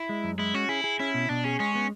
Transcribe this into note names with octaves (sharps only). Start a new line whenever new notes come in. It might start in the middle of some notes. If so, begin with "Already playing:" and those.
Already playing: E4
G#3
F#2
G#3 E4
C#4 F#4
E4 G#4
G#4
C#4 E4
B2
B2 D4
C#4 G#4
G#3 C#4
B3